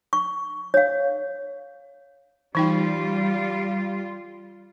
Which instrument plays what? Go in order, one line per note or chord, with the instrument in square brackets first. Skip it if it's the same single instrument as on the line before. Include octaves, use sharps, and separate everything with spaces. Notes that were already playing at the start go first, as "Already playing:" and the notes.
[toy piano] C#6
C#5 F5
[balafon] E3 D#4 G5 [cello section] G3 F4